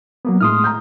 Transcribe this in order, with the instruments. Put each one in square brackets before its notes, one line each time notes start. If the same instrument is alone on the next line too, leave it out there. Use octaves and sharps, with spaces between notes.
[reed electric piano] F#3 A#3 B3
[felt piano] A2 G#3 [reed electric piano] C6 D#6 F6
[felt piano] A#5 G6